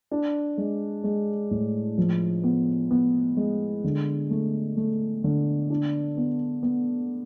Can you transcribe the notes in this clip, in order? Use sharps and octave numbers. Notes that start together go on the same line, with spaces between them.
D4
G#3
G#3
A2
F3
B3
B3
G#3
D3
A3
A3
D3
D4
B3
B3